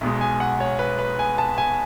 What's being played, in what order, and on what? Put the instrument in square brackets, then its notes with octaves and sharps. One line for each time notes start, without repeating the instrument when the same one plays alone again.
[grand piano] B1 B2 G#3
G#5
F#5
C#5
B4
B4
G#5
A5
G#5